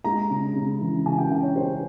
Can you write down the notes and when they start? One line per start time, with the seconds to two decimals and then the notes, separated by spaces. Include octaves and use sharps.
0.04 G#3 A#5
0.30 C#3
0.56 C#3
0.81 E3
1.06 C#3 G#5
1.18 G5
1.31 C#3 G5
1.43 C#5
1.56 C#3 C5